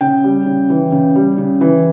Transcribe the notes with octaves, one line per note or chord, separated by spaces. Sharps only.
C#3 G5
G3
C#3
E3
C#3
G3
C#3
E3